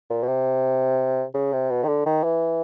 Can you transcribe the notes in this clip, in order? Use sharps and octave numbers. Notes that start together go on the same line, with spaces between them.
A#2
B2
C3
C#3
C3
B2
D#3
D3
D#3
E3